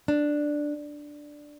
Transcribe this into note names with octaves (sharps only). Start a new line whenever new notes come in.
D4